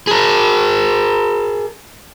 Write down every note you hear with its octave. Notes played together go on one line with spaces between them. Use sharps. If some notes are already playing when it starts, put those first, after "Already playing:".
G#4 A#4